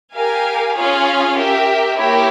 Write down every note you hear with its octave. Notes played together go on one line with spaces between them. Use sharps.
G4 A#4 F5 G#5
C#4 F4 G#4 C#5 F5
G4 A#4 E5
A#3 E4 G4 A#4 C#5